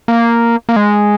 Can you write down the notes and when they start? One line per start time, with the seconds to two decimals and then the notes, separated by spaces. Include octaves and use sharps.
0.08 A#3
0.69 A#3
0.76 G#3